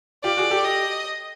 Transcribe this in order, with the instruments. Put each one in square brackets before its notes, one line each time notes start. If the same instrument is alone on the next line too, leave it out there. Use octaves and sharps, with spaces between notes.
[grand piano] F4 G4 [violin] D5
[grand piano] F#4 G#4
G4 A4
[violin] D#5